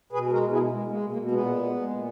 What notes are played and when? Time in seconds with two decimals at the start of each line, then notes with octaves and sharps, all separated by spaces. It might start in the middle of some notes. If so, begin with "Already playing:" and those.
0.13 B2 G#4 B4
0.28 G#3 F#4 A#4
0.43 B2
0.52 E4 G#4
0.57 G#3
0.71 G#3
0.87 G#3 A#3
1.02 B2
1.12 A#3
1.16 B2
1.31 A#2 G#3 B3
1.46 G#3
1.61 G#3
1.76 G#3
1.90 A#2